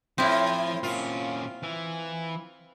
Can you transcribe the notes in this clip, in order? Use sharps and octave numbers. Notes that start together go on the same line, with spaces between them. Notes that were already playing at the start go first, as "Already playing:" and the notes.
F2 A2 F3 C4 E4
A#2 C#4 F4
E3